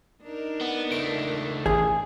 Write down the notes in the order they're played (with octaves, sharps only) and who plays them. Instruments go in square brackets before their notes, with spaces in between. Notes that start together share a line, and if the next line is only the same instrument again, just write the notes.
[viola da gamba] D4 D#4 A#4
[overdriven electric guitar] B3
[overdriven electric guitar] C#2 A3 [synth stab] D7
[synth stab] A1 [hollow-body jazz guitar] G#4